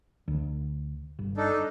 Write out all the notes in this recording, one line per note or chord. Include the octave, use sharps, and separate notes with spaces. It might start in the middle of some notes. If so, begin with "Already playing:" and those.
D2
G1
D4 D#4 A4